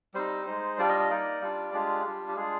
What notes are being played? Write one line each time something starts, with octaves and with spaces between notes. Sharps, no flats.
G3 C4 D#4 C5
G#3 D#4
G3 D4 F4 D5
D#5
D#5
A#3 D#4 D5
G3 D4 F4
G#3 D4 F4 G4
G3 D4 F4
G4
G#3 D4 F4 G#4